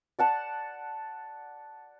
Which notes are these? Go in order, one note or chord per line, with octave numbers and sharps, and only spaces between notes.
D5 F#5 A5